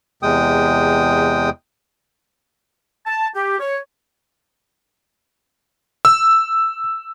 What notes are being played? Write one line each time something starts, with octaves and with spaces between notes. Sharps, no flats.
E2 C3 G#3 G5 D#6
A5
G4
C#5
E6